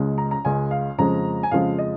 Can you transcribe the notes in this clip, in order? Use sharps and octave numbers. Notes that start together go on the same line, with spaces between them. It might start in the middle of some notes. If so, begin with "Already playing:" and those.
Already playing: C#2 C#3 G#3
A#5
A#5
C#2 C#3 G#3 G#5
F5
F2 C#3 F3 G#3 A#5
G#5
F2 C#3 F3 G#3 F5
D#5